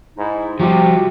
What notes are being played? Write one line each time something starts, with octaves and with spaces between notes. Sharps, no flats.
G#2 G#3 D#4 E4
C3 F3 G3 F#4 G4